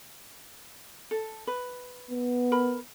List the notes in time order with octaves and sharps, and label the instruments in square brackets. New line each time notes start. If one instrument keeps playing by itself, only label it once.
[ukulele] A4
B4
[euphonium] B3
[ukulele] A#4 B5